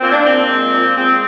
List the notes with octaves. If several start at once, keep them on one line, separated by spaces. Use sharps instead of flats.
A#2 C4
D4
A#2 C4
G#3
A#2
G#3 C4